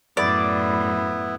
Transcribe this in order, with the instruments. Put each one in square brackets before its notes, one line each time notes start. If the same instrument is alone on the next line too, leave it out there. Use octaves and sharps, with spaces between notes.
[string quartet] F#2 A2 [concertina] B3 E4 [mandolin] D5